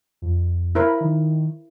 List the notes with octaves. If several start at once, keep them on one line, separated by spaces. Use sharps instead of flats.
F2
E4 A#4 C5 B5
D#3